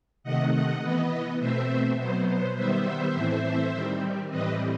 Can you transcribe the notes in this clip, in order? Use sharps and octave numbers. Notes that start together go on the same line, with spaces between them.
C3 D#3 A3 D#5 F#5
D#5 F#5
E3 B3 B4 D#5
B2 A3 C4 C5 E5
B2 F#3 B3 C5
C5
D#3 G3 B3 C5 E5
A2 E3 A3 C4
D#3 G3 C4
A2 E3 G3 C4 B4 D#5